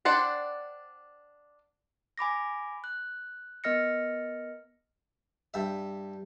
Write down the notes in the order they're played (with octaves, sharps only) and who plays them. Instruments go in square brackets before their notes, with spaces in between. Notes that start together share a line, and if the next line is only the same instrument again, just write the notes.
[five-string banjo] D4 C5 D5 F#5 G5
[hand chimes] G#5 B5 D6 A#6
F#6
B3 A#4 D#5 F6 A#6 C#7
[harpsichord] G2 E5